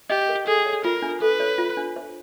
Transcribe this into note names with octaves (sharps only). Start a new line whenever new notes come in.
G4 D#5
A#4
G#4 A4
C#5
F4 A#4
D4
A4 B4
C#5
F4
D4
C5